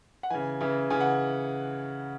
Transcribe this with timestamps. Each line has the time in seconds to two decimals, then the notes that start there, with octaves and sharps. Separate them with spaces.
0.23 F#5
0.30 C#3 E3 G#5
0.61 C#3 E3
0.90 C#3 E3 G#5
1.00 F#5